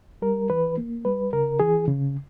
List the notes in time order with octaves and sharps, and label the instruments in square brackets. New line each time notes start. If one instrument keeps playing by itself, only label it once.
[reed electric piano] G3 A#4
E3 B4
A#3
G3 B4
C#3 A#4
E3 G#4
C#3